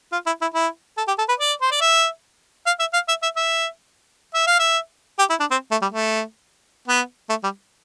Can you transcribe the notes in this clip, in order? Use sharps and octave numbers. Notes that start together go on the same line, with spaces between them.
F4
E4
E4
E4
A4
G4
A4
B4
D5
C5
D5
E5
F5
E5
F5
E5
E5
E5
E5
F5
E5
G4
E4
D4
C4
A3
G3
A3
B3
A3
G3